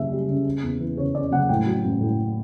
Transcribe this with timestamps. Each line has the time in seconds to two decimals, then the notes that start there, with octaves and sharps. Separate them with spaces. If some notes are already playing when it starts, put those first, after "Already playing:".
Already playing: F#1 C#3 G3 E5
0.11 G3
0.28 C#3
0.45 C#3
0.63 E2
0.80 E3
0.97 C#3 C#5
1.14 C#3 D5
1.31 F#1 F#5
1.49 A2 G5
1.66 F#3
1.85 A1
2.01 A2